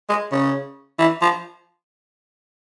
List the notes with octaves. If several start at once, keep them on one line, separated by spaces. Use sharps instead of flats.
G#3
C#3
E3
F3